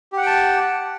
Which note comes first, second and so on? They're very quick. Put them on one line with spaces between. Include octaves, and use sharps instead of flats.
G4 F#5 G5 A5